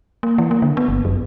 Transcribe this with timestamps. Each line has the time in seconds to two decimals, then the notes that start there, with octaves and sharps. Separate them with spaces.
0.23 A#3
0.38 E3
0.51 A#3
0.62 D3
0.77 B3
0.88 G1
1.05 F#2